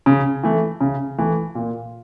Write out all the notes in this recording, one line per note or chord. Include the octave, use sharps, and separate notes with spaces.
C#3
E3 A3
C#3
E3 A3
A#2